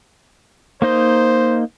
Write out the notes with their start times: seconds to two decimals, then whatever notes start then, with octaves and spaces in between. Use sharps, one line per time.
0.82 A#3 D#4 C5 D#5